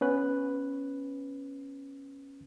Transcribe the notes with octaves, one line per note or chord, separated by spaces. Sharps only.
B3 C#4 B4 F#6